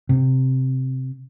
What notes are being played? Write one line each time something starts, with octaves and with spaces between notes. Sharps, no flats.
C3